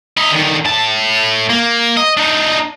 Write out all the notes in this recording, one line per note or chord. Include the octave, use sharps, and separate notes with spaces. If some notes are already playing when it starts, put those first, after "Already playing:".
E4 D#5
D3 D#3
A2 A5
A#3
D#5
D4 D#4